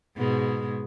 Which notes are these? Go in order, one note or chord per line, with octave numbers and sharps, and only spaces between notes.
G#2 B2 G#3